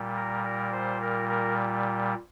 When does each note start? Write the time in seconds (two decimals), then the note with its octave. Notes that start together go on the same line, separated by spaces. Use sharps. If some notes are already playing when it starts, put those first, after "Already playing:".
Already playing: A#2 G3
0.15 A#4
0.44 A#4
0.72 C5
1.01 A#4
1.29 A#4